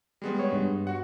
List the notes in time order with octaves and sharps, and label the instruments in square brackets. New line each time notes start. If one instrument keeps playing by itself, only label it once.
[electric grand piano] G3 G#3 B3
[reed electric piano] C#5
G2
[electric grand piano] F#4 F#5